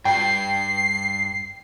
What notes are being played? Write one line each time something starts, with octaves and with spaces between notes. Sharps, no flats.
G2 G5 C7